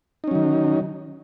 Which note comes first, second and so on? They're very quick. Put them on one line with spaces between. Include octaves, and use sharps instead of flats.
D#4 C#4 F#3 D#3